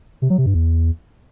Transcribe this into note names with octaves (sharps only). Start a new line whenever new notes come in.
C3
F#3
C3
G2
E2